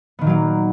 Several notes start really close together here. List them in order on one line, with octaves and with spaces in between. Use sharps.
B3 D#3 A#2 F#3 A#3